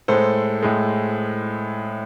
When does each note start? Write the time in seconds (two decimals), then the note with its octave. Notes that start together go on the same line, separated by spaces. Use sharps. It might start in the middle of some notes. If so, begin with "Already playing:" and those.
0.08 A2 G#3 A4 C5
0.63 A2 G#3